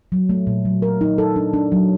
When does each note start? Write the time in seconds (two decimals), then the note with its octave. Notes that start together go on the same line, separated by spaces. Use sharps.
0.12 F#3
0.29 A3
0.47 A#2
0.65 F#3
0.82 A#4
1.01 D#4
1.18 A4
1.36 D4
1.53 D4
1.72 F#3